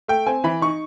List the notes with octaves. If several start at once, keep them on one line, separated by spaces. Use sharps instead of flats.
A3 G5
C4 G#5
E3 B5
D#4 C#6